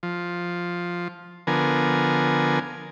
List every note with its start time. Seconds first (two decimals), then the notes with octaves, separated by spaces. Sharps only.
0.03 F3
1.47 D3 F3 B3 A#4 G#5